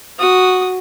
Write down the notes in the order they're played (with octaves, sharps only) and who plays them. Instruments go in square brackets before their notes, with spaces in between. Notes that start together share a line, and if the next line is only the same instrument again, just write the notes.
[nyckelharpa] F#4 D#6